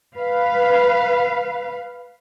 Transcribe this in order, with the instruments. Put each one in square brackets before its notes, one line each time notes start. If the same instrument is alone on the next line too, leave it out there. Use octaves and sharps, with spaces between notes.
[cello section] B4 F5